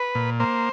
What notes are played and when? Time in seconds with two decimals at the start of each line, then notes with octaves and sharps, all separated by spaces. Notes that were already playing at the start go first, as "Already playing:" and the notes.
Already playing: B4
0.15 A#2
0.40 A#3 C5